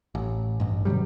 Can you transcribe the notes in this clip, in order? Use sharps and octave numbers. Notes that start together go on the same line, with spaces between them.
A1
A1 G2
B2 D3 F#3 G3